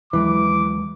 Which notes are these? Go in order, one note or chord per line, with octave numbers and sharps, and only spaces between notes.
D#2 E3 F#3 G#3 D6